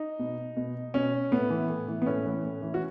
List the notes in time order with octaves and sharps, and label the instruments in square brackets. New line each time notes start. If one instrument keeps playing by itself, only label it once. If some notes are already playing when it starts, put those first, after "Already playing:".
Already playing: [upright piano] D#4
B2
B2
B2 C#4
A2 B3
E3
A2
E3
B3
A2 C#4
E3
A2
E3
F#4